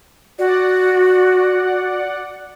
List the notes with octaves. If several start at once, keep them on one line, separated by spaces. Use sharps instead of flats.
F#4 D5 F#5